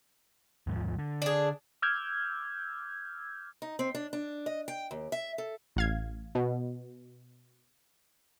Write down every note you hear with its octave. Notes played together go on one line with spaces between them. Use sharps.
D#2 G#2 F3
D3
D4 G#4
D6 E6 F6 G6 G#6
D#4
C4
D4
D4
D#5
G5
D#2
E5
A4
A1 F5 G#6
B2